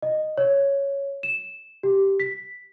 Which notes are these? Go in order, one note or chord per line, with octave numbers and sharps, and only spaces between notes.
D#5
C#5
E7
G4
B6